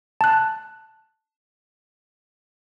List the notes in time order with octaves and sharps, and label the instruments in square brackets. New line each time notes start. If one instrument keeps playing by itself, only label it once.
[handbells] A5 F#6